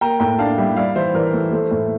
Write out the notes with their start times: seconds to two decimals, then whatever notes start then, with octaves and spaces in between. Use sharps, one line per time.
0.01 A#3 G5 A#5
0.20 A2 G5 A#5
0.39 D4 F5 A5
0.58 G3 E5 G5
0.76 E4 D5 F5
0.95 E3 C5 E5
1.14 E3 A#4 D5
1.33 A3
1.52 A3 A4 C5
1.71 A2